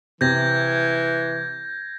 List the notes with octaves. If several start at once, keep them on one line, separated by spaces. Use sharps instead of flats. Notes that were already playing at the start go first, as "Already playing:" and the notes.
C3 E3 G6 G#6 A#6